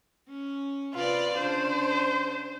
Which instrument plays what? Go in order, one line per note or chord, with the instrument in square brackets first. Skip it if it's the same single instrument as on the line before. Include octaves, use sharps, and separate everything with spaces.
[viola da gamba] C#4
[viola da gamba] C3 B4 D5 [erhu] F4
[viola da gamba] C#3 D4 [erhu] C5